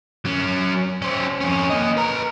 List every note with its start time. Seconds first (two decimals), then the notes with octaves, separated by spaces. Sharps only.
0.25 F#3 C#4
1.02 C#4 C5
1.41 F2 C#4
1.70 A#3 D#5
1.97 B4 A#5